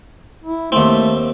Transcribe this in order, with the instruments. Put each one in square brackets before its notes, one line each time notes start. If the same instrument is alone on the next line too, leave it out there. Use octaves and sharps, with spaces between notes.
[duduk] E4
[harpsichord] D#2 C4 [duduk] A3